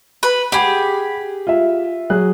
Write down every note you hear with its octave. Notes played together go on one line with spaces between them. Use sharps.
B4
G4 G#4 F#5 B5
F4 E5
F#3 G#4 F#6